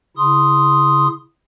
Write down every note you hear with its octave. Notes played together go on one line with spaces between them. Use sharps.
C#3 E4 C6 D#6